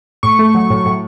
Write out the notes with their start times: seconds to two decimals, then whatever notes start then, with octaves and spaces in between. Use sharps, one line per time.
0.23 A2 C#6
0.39 A3
0.55 F#3
0.70 A2
0.86 A2